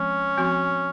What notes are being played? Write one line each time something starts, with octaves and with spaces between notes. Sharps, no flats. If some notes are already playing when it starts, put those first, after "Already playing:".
Already playing: F3 G#3 C4 C#4
F3 C4 F#4